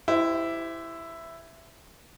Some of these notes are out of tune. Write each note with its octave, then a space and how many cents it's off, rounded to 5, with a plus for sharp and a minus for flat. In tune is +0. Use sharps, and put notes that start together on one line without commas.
E4 +5 G4 +0 C5 -30